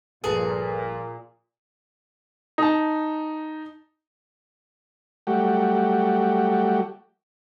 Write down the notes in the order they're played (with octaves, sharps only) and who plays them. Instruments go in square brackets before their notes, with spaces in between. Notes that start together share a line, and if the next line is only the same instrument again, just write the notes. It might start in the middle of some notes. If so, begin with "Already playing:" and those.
[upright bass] G1 F3 [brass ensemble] A#2 [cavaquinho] G#4 [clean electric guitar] A4 B4 A5
[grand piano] D#4 A5
[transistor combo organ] F#3 G3 A3 F#4 G4